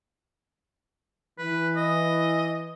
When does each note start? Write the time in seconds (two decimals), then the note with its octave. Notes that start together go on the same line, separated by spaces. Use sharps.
1.39 E3 B4
1.77 D#5